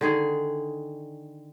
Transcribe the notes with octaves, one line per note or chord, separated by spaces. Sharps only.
D3 D#3 G#4